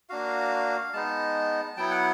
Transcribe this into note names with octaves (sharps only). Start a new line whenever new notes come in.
A#3 D4 F#4 F5
G#3 B3 D#4 A5
F#3 B3 E4 G5
F#5